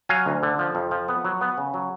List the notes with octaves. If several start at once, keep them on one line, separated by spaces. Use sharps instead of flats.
F#3 F5 G#5
D2
D3
F3
F2
F3
B3
F#3
B3
C#3
F#3